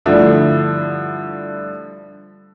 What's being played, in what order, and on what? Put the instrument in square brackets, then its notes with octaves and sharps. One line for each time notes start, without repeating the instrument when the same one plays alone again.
[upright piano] G2 D3 F3 A3 D4 E4